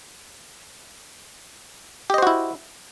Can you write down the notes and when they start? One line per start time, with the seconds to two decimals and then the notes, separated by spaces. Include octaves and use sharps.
2.10 G4
2.14 D#5
2.18 C5
2.22 F#4
2.27 E4